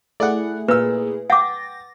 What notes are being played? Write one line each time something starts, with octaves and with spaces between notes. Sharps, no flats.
A3 E4 G#4 D5 F#5
A#2 B4 E6
F#5 G5 D6 A6 A#6